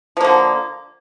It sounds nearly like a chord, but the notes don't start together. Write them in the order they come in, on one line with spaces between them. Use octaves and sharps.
F3 A#3 D3